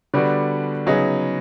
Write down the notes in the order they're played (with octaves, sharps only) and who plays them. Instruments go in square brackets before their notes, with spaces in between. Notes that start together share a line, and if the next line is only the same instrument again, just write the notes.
[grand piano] D3 G3 B3 D4 F#4
C#3 F#3 B3 D#4 G#4